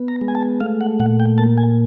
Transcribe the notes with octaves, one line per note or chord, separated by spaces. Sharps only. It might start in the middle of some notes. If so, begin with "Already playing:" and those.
Already playing: B3
A#5
G#3
G#5
A5
A3 F5
F#5
A#2 F#5
G5
A#3 A5
G#5